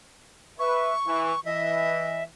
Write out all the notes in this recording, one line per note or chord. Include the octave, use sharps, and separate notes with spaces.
B4 E5 C#6
E3
E3 D#5 E5